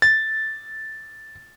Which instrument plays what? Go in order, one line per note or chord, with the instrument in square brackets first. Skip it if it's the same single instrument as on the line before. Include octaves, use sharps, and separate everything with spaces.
[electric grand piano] A6